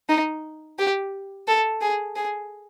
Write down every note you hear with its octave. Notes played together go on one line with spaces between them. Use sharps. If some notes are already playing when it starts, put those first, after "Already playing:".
D#4
G4
A4
G#4
G#4